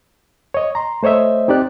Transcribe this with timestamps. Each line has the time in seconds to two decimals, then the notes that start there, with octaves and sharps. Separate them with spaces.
0.54 C#5 D#5
0.75 A#5 C6
1.03 A3 C5 C#5 D#5 E5
1.48 C4 D#4 G4 D5 F#6